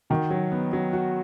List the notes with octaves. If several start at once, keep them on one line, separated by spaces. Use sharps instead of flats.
D#3 F#4
F#3
B3
F#3
F#4